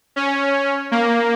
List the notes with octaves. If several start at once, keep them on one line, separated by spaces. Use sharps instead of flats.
C#4
A#3